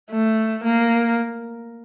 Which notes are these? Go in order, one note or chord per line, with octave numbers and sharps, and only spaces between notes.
A3
A#3